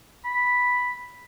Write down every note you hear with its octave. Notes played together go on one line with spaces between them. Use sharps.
B5